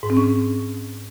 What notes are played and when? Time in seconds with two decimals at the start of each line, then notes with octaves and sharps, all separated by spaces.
0.03 G#2
0.10 C4
0.17 C#4